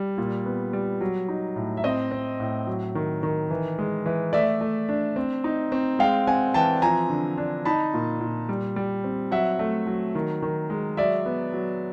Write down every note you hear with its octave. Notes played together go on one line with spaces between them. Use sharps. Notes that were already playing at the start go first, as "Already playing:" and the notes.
Already playing: G3
A#2
B3
G3
F#3
D#4
A2
E5
C4 D#5
C4
A2
F#3
D#3
D#3
E3
G#3
E3
A3 D5 E5
A3
D4
C4
D#4
C4
G#3 F5 G5
C4 F#5 G#5
E3 G5 A5
F3 G#5 A#5
D3
D4
D#4 A5 B5
A#2
A#2
G3
G3
C4
F#3 E5 F#5
A3
F#3
D#3
D#3
G#3
F#3 D5 E5
B3
F#3